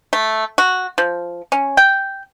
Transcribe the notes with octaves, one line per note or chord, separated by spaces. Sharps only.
A3
F#4
F3
C#4
G5